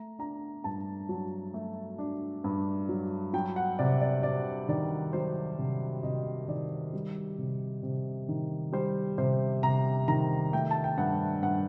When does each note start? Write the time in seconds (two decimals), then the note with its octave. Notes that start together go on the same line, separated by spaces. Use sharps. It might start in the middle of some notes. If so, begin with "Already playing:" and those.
Already playing: A3 A#5
0.19 D4 A#5
0.64 G2 A5
1.09 F#3
1.54 A3
1.98 D4
2.44 G2
2.89 F#3
3.33 F#3 G5
3.56 F#5
3.79 C3 D5
4.01 D5
4.23 C3 D5
4.69 D#3 D5
5.13 F#3 C5
5.59 C3
6.03 C3 D#5
6.48 D#3 D5
6.93 G3
7.38 C3
7.83 C3
8.29 D#3
8.73 G3 C5
9.18 C3 C5
9.63 C3 A#5
10.08 D#3 A#5
10.53 A3 G5
10.71 A5
10.84 G5
10.98 G2 F#5
11.42 G2 F#5